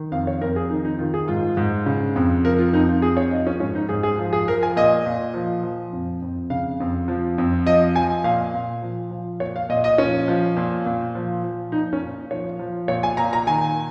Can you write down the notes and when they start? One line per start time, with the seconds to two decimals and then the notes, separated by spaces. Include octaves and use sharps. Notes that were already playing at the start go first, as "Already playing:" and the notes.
Already playing: D#3
0.12 F2 F5
0.27 C#5
0.41 F2 A#4
0.56 G#4
0.70 D#3 D#4
0.85 D#4
0.99 D#3 F4
1.14 G#4
1.28 G#2 F4
1.57 G#2
1.86 C#3
2.16 F2
2.44 F3 A#4
2.59 F4
2.73 F2 D#4
2.89 F4
3.02 F3 G#4
3.17 C#5
3.31 F3 D#5
3.47 C#4
3.60 G#2 C#4
3.75 D#4
3.89 G#2 G#4
4.03 G#4
4.18 F3
4.33 G#4
4.48 F3 A#4
4.63 G#5
4.76 A#2 D#5
5.06 A#2
5.34 F3
5.63 F3
5.93 F2
6.22 F2
6.50 C#3 F5
6.80 F2
7.08 F3
7.38 F2
7.66 F3 D#5
7.95 F3 G#5
8.24 A#2 F5
8.54 A#2
8.82 F3
9.11 F3
9.40 A#2 C#5
9.56 F5
9.69 A#2 D#5
9.84 D#5
9.98 F3 C#4
10.28 F3
10.57 A#2
10.86 A#2
11.15 F3
11.43 F3
11.72 A#2 D#4
11.93 C#4
12.01 A#2
12.31 F3 C#5
12.59 F3
12.88 A#2 C#5
13.03 G#5
13.17 A#2 A#5
13.33 A#5
13.47 D#3 G#5